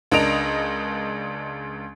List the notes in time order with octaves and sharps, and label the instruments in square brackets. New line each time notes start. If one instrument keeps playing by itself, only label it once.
[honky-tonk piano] C#2 D4 A#4 D#5 D7 F7